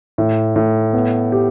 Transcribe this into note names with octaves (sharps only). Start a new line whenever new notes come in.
A2
A2
B3
G4